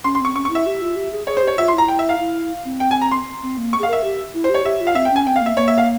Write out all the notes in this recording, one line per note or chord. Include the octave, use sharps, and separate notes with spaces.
C#4 C6
C6
C4 C#6
C#4 C#6
C#6
E4
E5
G4
F4
G4
G#4
G#4 C#5
C5
G4 C#5
F4 E5
C6
E4 A#5
G5
E5
F5
E4
C4
G5
G#5
A#5
C6
C4
A#3
C#6
G#4 F5
A#4 E5
G4
E4
C5
G4 C#5
G4 E5
F4
F5
C4 E5
G5
C#4
G#5
C4 G5
F5
A#3 E5
A#3 C#5
E5
F5